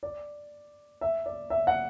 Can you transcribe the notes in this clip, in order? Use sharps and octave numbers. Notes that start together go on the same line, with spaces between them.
D5
E5
D5
E5
F#5